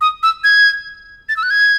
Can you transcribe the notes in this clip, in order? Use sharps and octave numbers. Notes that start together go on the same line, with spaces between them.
D#6
E6
G#6
A6
E6
F#6
G#6